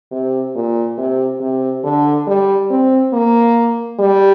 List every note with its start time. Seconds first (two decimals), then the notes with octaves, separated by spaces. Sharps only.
0.12 C3
0.55 A#2
0.98 C3
1.41 C3
1.84 D3
2.27 G3
2.70 C4
3.13 A#3
3.99 G3